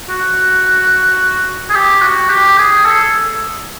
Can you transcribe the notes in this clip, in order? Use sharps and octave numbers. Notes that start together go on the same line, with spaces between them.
F#4
G#4
G4
F#4
G4
G#4
A4